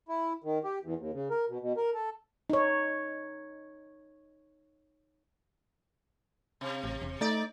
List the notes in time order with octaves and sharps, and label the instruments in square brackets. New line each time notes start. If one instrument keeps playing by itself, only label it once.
[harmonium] E4
D#3
G4
E2
D#2
C#3
A#4
B2
B2
A#4
A4
[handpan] D#4 C#5
[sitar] C3
[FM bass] A1
E1
[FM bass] A3 [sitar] D#4 D5